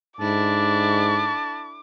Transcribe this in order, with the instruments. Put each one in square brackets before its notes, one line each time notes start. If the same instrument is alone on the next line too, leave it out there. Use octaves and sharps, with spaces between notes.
[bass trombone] G#2 [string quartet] D4 E4 A4 [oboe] A5 [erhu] D6